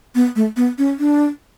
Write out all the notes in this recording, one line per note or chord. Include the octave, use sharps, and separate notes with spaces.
B3
A3
B3
C#4
D4